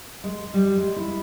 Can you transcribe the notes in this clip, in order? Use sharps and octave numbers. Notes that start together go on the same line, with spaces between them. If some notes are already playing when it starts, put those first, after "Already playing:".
G#3
G3
G#3
E4